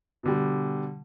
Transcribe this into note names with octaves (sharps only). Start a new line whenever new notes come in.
B2 D3 G3